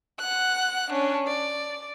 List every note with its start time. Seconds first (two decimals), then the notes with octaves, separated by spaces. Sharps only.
0.19 F#5 F#6
0.91 C#4 D4
1.27 D5